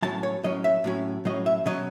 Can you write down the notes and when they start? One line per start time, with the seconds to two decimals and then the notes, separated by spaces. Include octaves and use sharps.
0.02 A2 F#3 C#4 A5
0.23 C#5
0.43 A2 F#3 C#4 D#5
0.64 E5
0.84 A2 F#3 C#4
1.25 A2 F#3 C#4 D#5
1.46 E5
1.66 B2 F#3 C#4 D#5